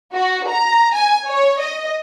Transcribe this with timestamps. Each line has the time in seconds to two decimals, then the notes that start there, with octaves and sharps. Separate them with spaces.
0.14 F#4
0.48 A#5
0.94 G#5
1.28 C#5
1.60 D#5